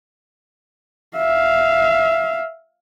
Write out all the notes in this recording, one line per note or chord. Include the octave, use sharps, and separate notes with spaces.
E5 F5